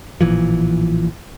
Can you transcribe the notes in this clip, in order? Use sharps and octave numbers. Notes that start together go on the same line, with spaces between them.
A1 A#2 E3 F3